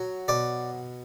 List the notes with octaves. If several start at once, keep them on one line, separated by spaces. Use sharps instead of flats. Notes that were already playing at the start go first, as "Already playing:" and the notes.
Already playing: F#3
B2 D5